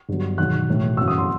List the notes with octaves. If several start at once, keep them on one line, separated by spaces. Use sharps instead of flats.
G1 G2 F#3
E1 E2 D#3 F#3 F#6
B1 A2 E3
G1 F#2 E3 E6
D#6
C6